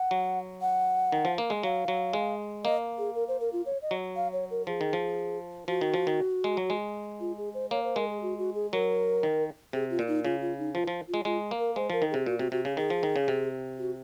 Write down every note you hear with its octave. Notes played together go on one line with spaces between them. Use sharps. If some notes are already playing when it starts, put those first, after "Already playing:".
Already playing: F#5
F#3
F#5
D#3
F3
A#3
G#3
F#3 F5
F#3
G#3
A#3 D#5
G#4
A#4
C5
A#4
F4
C#5
D#5
F#3
F5
C#5
A#4
F3 G#4
D#3
F3
F3 F#4
D#3
F3
D#3
G#3
F#3
G#3
F4
G#4
C5
A#3 C#5
C5
G#3 A#4
G#4
F#4
F#4
G#4
F#3 A#4
D#3
C3 G#4
F4
A#2
D#4
C#3 F4
F4
D#4
F3 F4
F3
F4
G#3
G#3 F4
A#3
A#4
G#3 C5
F3 A#4
D#3
C3 G#4
A#2 F#4
C3 F#4
C3 F#4
C#3 G#4
D#3 G#4
F3
D#3
C#3
C3
F#4